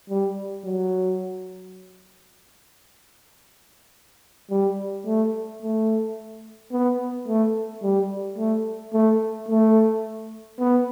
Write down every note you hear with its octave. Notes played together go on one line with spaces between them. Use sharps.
G3
F#3
G3
A3
A3
B3
A3
G3
A3
A3
A3
B3